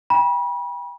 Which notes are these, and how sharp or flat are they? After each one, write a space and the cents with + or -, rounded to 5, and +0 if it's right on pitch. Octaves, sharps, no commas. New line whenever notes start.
G5 +35 B5 -30